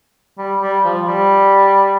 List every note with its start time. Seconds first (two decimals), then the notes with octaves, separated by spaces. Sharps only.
0.39 G3
0.62 G3
0.85 F3
1.08 G3